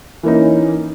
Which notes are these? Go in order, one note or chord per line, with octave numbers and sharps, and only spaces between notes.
E3 A#3 C#4 D#4